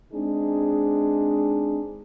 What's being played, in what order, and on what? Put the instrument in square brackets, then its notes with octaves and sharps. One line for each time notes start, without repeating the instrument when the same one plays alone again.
[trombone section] G#3 C4 D4 D#4 G#4